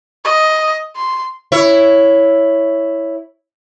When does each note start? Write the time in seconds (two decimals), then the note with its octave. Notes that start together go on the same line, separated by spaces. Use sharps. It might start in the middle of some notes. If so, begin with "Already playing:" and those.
0.25 D#5
0.96 C6
1.52 E4 C#5